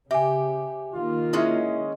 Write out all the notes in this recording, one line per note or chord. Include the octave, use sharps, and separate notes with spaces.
C#3 G4 E5 G#5
D#3 A#3 F4
G#3 C#4 E4 D#5 E5